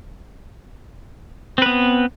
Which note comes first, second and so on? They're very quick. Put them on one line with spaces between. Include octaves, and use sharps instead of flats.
C4 B4 B3